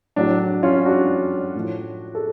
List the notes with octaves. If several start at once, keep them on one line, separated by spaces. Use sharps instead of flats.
A2 F#3 D4
D4
C#4 F4
D4 F#4
A2 F3
A4